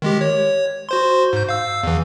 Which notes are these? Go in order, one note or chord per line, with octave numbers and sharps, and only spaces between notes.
D#3 G#3 G4
C#5
F#4 C5 C6
G#2 G6
F5 E6
E2 E3